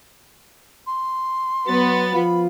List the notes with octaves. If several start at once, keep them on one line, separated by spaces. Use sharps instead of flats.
C6
F#3 B3 A6
F3 F4 B5